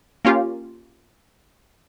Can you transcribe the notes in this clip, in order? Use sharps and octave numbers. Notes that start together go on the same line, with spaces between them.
A#3 C#4 F4 G4